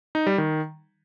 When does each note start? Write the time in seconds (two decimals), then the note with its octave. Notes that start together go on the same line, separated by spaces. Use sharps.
0.15 D#4
0.27 G3
0.38 D#3